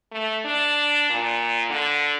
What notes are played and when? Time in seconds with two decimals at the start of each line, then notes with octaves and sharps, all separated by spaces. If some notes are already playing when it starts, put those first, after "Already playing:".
0.11 A3
0.45 D4
1.10 A#2
1.70 D3